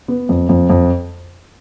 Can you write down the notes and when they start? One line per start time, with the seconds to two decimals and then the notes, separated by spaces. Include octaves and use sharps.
0.08 B3
0.29 F2
0.49 F2
0.70 F2